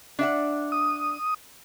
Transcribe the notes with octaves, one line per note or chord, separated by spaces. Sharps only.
D4 E5 F#5
D#6